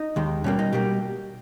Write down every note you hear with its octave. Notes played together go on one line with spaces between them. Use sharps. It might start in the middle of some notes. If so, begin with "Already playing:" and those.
Already playing: D#4
D#2 D#3 G#3
B2 G3 A#3 C#4
D#4
B2 G3 A#3 G4